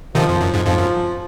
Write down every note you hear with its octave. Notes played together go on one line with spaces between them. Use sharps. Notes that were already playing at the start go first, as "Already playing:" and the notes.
C3 D#3 F3
F2
F#2
F2 G#2
F2 G#2 F3
F#2